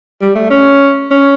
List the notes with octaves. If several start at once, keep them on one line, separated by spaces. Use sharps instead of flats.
G3
A3
C#4
C#4